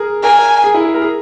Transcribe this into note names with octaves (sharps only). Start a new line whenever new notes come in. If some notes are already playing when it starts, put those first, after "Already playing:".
Already playing: G#4 A#4
A#4 G#5
G#4
E4
G#4
A#4
G#4